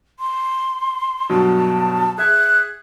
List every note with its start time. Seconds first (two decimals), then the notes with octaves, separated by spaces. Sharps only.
0.20 C6
1.29 G2 B2 F#3 A5
2.18 G#4 E5 F#6 G#6